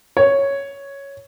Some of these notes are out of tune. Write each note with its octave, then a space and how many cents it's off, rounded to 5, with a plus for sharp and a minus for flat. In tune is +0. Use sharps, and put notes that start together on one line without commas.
C#5 +0